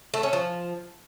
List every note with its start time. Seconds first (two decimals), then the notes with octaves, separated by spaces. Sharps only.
0.14 A3
0.23 C#4
0.33 F3